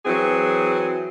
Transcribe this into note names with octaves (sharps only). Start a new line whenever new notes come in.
E3 F#3 C4 G#4